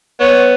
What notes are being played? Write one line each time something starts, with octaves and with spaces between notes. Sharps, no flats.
B3 C#5